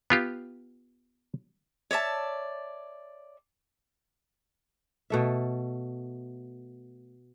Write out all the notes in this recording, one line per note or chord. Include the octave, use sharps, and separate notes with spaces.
B3 F4 G4
C#5 D5 E5 A5
B2 A3 E5